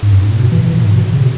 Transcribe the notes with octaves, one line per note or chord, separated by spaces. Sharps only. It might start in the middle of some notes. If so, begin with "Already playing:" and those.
G#2
F#2
G#2
A#2
B2
E3
E3
A#2
G#2
B2
C#3
B2